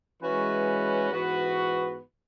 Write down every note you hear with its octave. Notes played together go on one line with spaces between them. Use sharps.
E3 G#3 C#4 F#4 B4
G#2 E3 B3 F#4 B4